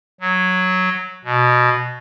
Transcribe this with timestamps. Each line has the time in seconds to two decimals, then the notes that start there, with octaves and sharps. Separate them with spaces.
0.21 F#3
1.25 B2